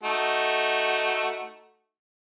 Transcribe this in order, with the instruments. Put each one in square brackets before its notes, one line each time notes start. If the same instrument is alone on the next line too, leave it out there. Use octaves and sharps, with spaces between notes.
[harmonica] A3 D#4 F#4